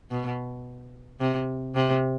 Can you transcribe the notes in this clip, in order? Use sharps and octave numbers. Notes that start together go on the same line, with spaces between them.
B2
C3
C3